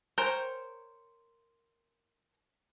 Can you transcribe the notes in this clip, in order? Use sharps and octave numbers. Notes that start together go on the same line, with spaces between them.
A#4 C5 C#5 G5 G#5